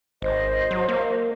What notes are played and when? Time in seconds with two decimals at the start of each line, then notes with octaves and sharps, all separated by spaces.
0.22 G#1 C5 D#5
0.71 F#3
0.88 A#3